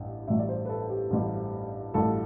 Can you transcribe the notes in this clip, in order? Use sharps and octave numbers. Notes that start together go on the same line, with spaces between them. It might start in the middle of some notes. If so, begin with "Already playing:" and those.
Already playing: A1 G2
A1 G2 F#3 E5
D5
C5
B4
A4
G4
A1 G2 F#3
A1 G2 F#3 A4